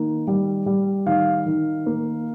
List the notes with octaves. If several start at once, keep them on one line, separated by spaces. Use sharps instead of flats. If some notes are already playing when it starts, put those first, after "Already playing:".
Already playing: D#3 A#3
G3
G3
D#3 F5
D#3
A#3